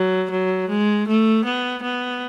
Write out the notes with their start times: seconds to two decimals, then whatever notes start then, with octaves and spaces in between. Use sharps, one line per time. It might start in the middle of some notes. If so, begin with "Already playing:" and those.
Already playing: F#3
0.31 F#3
0.69 G#3
1.08 A3
1.45 B3
1.83 B3